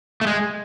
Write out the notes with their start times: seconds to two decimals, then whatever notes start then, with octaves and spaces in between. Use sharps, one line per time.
0.21 A3
0.27 G#3